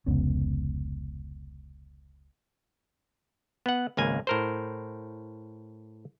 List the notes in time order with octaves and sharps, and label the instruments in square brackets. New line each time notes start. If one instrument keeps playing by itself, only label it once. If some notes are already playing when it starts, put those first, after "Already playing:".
[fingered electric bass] F1 C#2 B3 C#4
[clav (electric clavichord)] B3 F#5
G#1 C#2 A#3 G#5
A2 A#4 C5